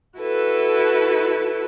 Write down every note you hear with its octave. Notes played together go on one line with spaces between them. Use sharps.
E4 F#4 A4 B4